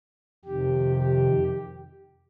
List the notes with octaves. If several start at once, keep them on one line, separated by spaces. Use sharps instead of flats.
F2 C3 D#3 G4
G4